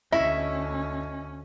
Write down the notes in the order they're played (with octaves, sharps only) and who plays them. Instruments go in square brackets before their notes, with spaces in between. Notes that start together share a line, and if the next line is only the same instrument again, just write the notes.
[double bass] D2 C#4 [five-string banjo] E4 [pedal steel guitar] D#5 C#6 [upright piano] E5